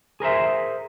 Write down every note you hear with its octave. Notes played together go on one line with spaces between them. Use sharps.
G#4 A#4 C5 E5